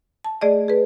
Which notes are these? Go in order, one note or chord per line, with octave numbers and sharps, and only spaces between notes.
A5
A3 G#4 D5 D#5
G#4 B4